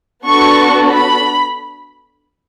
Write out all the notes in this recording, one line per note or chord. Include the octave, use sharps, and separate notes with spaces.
B3 D4 F#4 A4 C#6
B5